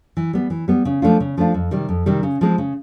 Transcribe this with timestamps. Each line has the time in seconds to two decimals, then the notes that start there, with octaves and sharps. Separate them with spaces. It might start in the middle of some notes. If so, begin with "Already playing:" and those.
0.17 E3
0.33 G3 B3
0.50 E3
0.68 G3 B3
0.85 C#3
1.02 F3 A3 D4 F4
1.20 C#3
1.38 F3 A3 D4 F4
1.54 F2
1.71 C3 D#3 G3
1.89 F2
2.06 C3 D#3 G3
2.23 C#3
2.41 F3 G#3 C4
2.58 C#3